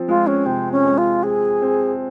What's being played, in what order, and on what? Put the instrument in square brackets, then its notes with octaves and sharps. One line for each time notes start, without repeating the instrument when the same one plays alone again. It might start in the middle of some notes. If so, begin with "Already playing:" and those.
Already playing: [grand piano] F3 C4
[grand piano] G#3 [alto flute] F4
[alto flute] C#4
[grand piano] C3 [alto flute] C4
[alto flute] C#4
[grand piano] G#3
[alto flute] F4
[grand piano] C4 [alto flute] G#4
[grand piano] C4